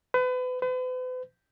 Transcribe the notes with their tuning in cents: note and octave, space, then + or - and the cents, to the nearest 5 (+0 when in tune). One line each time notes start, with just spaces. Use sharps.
B4 +35
B4 +45